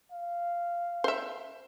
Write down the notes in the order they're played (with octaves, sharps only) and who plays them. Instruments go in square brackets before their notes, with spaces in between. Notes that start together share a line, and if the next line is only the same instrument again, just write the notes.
[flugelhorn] F5
[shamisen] C5 E5